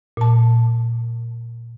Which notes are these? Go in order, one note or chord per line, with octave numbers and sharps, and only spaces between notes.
A#2 A5